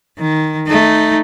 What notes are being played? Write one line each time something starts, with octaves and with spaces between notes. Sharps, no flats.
D#3
A3 D#4